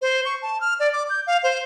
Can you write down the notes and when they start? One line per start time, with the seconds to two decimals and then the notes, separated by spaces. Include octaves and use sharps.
0.02 C5
0.25 C#6
0.42 A5
0.61 F6
0.80 D5
0.93 D6
1.10 G6
1.27 F5
1.43 C5